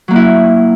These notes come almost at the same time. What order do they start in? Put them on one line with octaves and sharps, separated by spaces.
F#3 A#3 F#4 E4